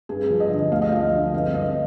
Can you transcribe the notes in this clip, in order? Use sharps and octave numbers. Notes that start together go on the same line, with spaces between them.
G2 G#4
F3
D#5
D3
D2 F5
D#5
F3 F5
D3
G2 F5
G2 D#5